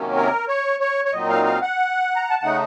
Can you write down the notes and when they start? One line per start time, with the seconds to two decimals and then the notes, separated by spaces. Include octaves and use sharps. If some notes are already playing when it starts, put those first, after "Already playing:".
Already playing: C3 D#3 F#3 A#3 C#4
0.16 A#4
0.48 C#5
0.80 C#5
1.05 C#5
1.13 A#2 F#3 C4 D#4 D#5
1.29 F5
1.45 F5
1.62 F#5
2.16 A#5
2.29 A5
2.42 C#3 A3 D#4 F#5